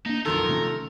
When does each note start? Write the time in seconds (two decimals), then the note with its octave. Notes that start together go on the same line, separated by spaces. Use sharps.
0.06 A#3 D4 D#4
0.25 B1 F#2 D#3 F3 F#3 A4 A#4
0.49 C3 A3 C#4